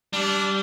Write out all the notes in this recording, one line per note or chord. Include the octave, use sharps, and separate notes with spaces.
G3 D4